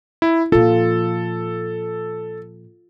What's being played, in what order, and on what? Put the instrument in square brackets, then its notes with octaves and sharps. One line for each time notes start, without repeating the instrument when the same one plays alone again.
[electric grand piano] E4
[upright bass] A#2 F3 [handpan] F4 [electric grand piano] A4